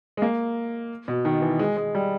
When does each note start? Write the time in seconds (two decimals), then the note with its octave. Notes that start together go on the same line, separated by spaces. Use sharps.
0.17 G#3
0.22 A#3
1.08 B2
1.25 D#3
1.42 E3
1.59 G#3
1.77 G#3
1.95 G3